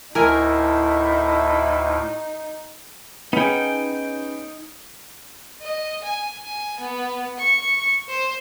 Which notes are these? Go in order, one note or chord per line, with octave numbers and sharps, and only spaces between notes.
D2 A2 D#4 E4 A#4 G#5
B3 C#4 D#4 G#4 G5
D#5
G#5
G#5
B3
C#6
C5